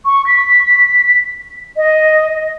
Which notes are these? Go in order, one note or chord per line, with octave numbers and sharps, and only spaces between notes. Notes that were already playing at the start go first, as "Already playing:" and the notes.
C#6
B6
D#5